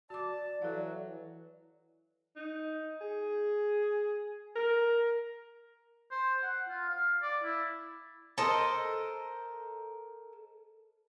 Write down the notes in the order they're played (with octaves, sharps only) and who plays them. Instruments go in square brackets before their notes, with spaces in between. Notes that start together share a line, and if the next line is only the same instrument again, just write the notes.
[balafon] F#4 D6 [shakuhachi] D5 [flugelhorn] A5
[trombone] E3 [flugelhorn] F#3 [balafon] A4 F5
[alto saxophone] D#4
G#4
A#4
[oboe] C5
F#5
F4
F5
D5
E4
[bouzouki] A4 A#4 C5 D#5